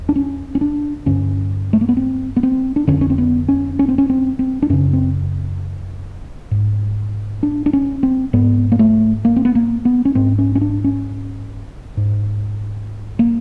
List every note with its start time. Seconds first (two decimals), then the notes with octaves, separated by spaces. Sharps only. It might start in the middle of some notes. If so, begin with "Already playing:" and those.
Already playing: E2
0.09 D4
0.16 C#4
0.55 C#4
0.61 D4
1.06 G2 D3 C#4
1.73 A3
1.81 A#3
1.89 B3
1.97 C4
2.36 B3
2.43 C4
2.76 D4
2.87 F2 D3 C#4
3.01 C#4
3.10 C4
3.18 B3
3.48 C#4
3.79 C#4
3.88 C4
3.98 C#4
4.10 C4
4.39 C4
4.62 D4
4.70 F#2 C#3 C#4
4.93 C4
6.51 G#2
7.43 D4
7.66 D4
7.73 C#4
8.03 C4
8.33 G#2 B3
8.72 A#3
8.79 A3
9.25 A#3
9.36 C4
9.45 B3
9.55 A#3
9.85 B3
10.05 C#4
10.15 G#2 C4
10.38 C#4
10.55 C#4
10.61 D4
10.84 C#4
11.97 G#2
13.19 A#3